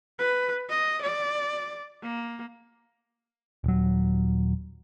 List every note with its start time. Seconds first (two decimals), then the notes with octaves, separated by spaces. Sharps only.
0.19 B4
0.69 D#5
1.02 D5
2.03 A#3
3.64 D#1 F#3